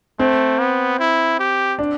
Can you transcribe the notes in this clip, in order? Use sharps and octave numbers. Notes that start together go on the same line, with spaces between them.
A3 C4
B3
E4
G4
D4